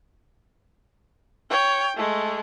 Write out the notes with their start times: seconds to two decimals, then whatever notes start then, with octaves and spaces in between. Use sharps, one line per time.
1.50 C#5 G5
1.97 G#3 A3